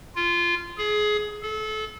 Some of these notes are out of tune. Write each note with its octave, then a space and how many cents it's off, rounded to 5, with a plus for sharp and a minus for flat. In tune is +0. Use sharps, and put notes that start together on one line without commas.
F4 -15
G#4 +20
A4 -30